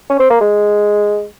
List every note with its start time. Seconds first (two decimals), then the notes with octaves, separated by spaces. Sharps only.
0.10 C#4
0.19 C4
0.30 A#3
0.41 G#3